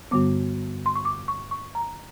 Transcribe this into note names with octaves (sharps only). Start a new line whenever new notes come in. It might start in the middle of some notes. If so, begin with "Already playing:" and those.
G2 D3 G3 B3 D6
C6
C#6
D6
C#6
C#6
A#5